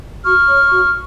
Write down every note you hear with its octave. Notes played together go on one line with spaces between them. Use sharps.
F#4 C#6 F6
C#5
F#4